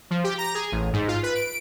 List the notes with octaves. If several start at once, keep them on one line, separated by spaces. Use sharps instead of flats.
F3
G4
A#5
G#4
A1
G#2
F4
B4
D7